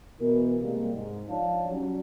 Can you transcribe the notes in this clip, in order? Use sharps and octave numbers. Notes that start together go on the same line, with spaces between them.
B2 E3 E4 A#4
C3 G3 G#3 A#3
G#2
F3 D4 D#4 C#5 F5 A5
F#3 G3 C#4